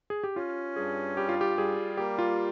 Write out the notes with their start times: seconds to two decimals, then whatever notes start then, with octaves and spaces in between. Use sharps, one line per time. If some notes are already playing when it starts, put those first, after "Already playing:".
0.10 G#4
0.24 G4
0.35 C#4 F4
0.76 G2 G#4
1.17 G3 G4
1.29 F4
1.41 G4
1.58 G3 G#4
1.97 A#3 G4
2.19 F4